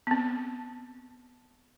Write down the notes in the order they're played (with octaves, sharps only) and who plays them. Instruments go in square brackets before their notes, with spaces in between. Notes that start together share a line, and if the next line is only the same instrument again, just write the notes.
[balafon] B3 C4